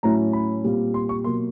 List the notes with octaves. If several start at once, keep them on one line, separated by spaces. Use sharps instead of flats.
A2 F#3 A3 C#4 E4 A#5
B5
A#2 G3 C4 F4
C6
C#6
B2 F#3 A#3 C6